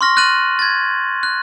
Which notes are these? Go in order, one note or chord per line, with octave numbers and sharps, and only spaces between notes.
C6 C#6 F6 A#6
F6 F#6 A6 D#7 F#7
G#6 A6
F#6